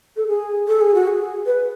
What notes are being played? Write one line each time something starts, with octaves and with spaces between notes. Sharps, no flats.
A4
G#4
A4
G#4
F#4
G#4
B4